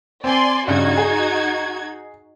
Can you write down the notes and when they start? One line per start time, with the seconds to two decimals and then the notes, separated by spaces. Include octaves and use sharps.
0.24 C4 D5 G#5 C6
0.68 G2 C#3 D#4 F#4 G#6
0.97 G#4